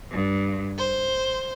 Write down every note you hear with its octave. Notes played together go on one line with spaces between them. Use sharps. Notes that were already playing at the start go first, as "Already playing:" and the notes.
G2
C5